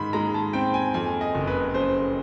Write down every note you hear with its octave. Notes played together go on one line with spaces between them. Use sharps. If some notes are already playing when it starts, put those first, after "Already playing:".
Already playing: G#2 D#3 B5
G#3 A#5
A5
C4 G5
G#5
F2 G#5
D#5
F#1
B4
C#3 C5